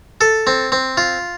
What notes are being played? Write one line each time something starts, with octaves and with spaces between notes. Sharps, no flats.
A4
C4
C4
F4